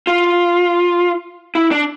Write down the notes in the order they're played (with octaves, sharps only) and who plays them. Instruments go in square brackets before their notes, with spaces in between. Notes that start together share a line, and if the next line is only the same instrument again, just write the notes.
[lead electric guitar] F4
E4
D4